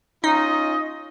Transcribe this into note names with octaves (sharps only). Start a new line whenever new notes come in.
C#4 D#4 F4 D#5